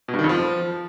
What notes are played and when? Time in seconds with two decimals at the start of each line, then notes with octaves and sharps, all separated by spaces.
0.08 B2
0.14 G2
0.19 D#3
0.24 F2
0.29 F3